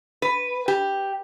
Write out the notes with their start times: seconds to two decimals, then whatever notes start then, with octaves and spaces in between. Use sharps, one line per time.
0.22 B4
0.68 G4